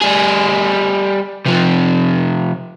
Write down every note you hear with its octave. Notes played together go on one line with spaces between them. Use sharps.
G3 G#4
C3 F3